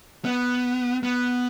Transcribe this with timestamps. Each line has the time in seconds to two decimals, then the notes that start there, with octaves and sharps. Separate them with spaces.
0.25 B3
1.03 B3